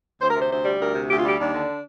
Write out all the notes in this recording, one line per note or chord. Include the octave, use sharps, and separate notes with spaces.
D2 C5
A#4
C3 C5
D2 C5
G3
D2 A#4
C3
D2 G4
F4
G3 G4
D#2 D4
D3